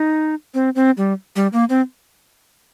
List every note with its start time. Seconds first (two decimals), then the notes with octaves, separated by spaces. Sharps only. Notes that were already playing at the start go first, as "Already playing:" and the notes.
Already playing: D#4
0.54 C4
0.75 C4
0.97 G3
1.36 G3
1.53 A#3
1.70 C4